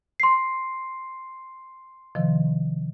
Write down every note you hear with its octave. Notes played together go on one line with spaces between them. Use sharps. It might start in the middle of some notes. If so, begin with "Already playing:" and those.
C6 C7
C3 D#3 F3